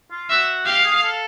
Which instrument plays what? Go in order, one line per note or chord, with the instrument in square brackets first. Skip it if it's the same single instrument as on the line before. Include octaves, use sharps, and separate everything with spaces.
[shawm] F4
[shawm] F#4 [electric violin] E5
[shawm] G4 [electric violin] F5
[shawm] G#4
A4